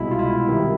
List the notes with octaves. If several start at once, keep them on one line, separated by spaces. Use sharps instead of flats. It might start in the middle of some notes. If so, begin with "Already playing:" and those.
Already playing: C2 B2 G#3 E4
F4
E4
C2 C3 D#3